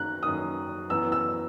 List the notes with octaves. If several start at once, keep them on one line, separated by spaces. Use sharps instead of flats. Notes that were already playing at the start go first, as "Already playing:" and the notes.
Already playing: F#2 D#3 A#3 F#6
F#2 D#3 A#3 D#6
F#2 E3 B3 E6
E6